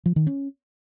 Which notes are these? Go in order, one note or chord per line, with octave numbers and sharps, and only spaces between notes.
F3
D#3
C#4